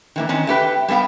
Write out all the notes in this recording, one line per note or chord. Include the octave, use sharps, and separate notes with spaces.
D#3 E3 A#3
D#3 C4 C#4 D#4
A3 G4 B4 G5
G3 A3 B3 F5 G5